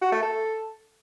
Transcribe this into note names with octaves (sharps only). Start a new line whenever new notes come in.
F#4
A3
A4